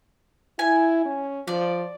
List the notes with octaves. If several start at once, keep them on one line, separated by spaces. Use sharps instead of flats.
E4 G#5
C#4
F3 D5